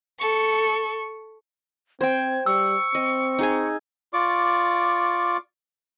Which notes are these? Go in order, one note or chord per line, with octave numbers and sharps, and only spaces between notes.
A4 C#6
C4 C5 G5 G#6
G3 C#6 E6
C4 D#5
D#4 G#4 G#5
F4 D5 C#6 D6